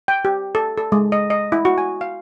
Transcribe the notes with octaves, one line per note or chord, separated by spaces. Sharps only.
G5
G4
A4
A4
G#3
D#5
D#5
E4
F#4
G#5
F5